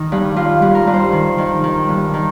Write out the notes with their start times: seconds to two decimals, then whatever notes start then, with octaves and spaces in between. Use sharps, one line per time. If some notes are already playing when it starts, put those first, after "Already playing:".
Already playing: D#3 D#4
0.12 G2
0.36 G2 F4
0.62 G2
0.75 A#4
0.87 G2
0.93 C5
1.12 D#3
1.38 D#3
1.64 D#3
1.88 G2
2.14 D#3